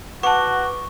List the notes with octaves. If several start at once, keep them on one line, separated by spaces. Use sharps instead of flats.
F#4 B4 F#5 A5 C#6 D6